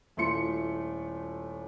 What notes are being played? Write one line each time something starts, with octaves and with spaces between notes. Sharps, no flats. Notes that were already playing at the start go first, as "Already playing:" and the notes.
D#1 A3 E4 F4 C6 C#7